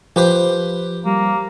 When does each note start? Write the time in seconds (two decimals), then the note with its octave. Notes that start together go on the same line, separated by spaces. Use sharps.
0.16 F3 G4 B4 C5
1.06 G3 A#3